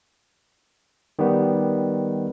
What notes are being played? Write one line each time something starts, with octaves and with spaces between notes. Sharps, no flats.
D#3 G3 B3